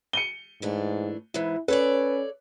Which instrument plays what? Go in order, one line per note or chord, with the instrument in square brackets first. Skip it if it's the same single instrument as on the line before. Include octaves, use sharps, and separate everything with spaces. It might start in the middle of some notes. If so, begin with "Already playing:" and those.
[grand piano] C#7 D#7 G7
[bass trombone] G#2 [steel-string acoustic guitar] E3 A3 D4
[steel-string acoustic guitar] G#2 E3 [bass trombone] E4
[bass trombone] C#4 [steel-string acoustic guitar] A4 C#5 D5 [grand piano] B4